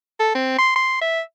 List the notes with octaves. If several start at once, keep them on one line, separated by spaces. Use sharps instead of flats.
A4
C4
C6
C6
E5